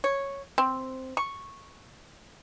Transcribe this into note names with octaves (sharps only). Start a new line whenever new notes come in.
C#5
C4
C#6